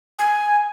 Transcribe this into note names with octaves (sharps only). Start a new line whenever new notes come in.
G#5